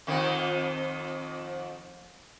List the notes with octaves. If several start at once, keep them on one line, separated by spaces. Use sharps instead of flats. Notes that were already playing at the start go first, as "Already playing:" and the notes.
F2 D#3